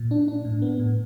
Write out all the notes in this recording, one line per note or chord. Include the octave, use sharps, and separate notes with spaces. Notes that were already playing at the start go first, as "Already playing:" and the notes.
Already playing: A#2
D4
D4
A2
B3
A2